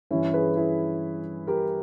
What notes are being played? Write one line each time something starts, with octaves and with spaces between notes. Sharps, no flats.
G2 E3 C#4 E4
G#4 B4
E4 G#4
G4 A#4